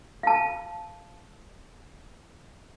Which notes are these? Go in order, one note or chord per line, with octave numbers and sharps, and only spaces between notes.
F5 A5